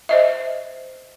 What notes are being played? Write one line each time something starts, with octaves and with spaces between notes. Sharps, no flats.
C5 D#5 E5